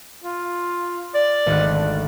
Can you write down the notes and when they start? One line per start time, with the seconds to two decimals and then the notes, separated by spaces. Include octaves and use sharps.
0.24 F4
1.15 D5
1.46 G#1 D2 F#6